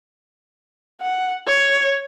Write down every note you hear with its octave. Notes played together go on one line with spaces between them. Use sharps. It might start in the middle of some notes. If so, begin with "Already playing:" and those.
F#5
C#5